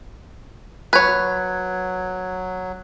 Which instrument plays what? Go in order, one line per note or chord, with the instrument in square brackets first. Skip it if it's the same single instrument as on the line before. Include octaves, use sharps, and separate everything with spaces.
[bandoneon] F#3 [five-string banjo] B4 C#5 [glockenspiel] F#6 G#6